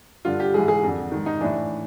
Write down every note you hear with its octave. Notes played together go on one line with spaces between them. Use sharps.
G2 D3 F4
G4
G#2 E3 G#4
G#4
F2 D3
G#2 D#3
D#4
A2 E3 D4